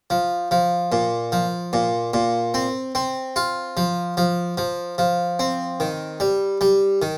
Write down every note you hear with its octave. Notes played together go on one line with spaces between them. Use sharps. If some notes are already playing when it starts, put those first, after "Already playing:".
F3
F3
A#2
F3
A#2
A#2
C4
C4
F4
F3
F3
F3
F3
C4
D#3
G3
G3
D#3